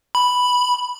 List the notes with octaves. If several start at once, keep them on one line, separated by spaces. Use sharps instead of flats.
B5